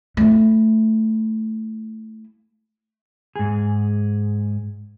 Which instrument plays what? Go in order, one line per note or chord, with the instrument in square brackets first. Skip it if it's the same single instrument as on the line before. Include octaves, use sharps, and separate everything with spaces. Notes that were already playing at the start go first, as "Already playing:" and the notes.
[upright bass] A3 E4
[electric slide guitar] G#2 G#4